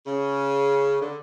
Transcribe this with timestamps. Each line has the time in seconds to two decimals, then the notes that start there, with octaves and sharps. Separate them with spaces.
0.06 C#3
1.01 D3